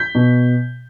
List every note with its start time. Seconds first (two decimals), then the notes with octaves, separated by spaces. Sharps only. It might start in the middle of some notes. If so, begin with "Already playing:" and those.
Already playing: G6 B6
0.15 B2